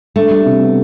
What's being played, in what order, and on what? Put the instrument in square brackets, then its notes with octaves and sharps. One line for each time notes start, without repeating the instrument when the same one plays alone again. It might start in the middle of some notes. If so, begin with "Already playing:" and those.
[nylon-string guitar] A3 [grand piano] D4
[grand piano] G3
C3
B3